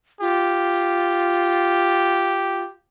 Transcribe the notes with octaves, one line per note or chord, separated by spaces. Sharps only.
F4 G4